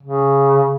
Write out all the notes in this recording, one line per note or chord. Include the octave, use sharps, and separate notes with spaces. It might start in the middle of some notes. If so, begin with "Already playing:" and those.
C#3